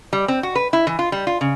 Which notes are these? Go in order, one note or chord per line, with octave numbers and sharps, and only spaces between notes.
G3
C4
F#4
B4
E4
E3
F4
G3
F4
C#3